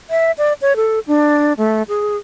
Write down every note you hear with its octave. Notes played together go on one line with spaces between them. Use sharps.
E5
D5
C#5
A4
D4
A3
G#4